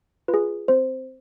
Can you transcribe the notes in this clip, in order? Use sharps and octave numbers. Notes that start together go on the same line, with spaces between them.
F4 B4
G#4
C4 C5